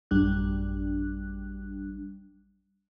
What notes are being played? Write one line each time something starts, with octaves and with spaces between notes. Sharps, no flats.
A1 F#2 G3 D4 F#6